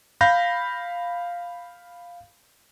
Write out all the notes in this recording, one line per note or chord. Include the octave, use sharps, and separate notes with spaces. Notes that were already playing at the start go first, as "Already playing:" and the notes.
F5 B5 G6 A#6